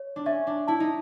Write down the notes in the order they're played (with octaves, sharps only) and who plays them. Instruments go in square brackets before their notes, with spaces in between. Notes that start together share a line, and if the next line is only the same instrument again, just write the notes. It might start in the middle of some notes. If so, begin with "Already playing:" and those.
Already playing: [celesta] C#5
[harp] D4
[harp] C#4 [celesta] E5
[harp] D4
[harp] E4 [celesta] A5
[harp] D#4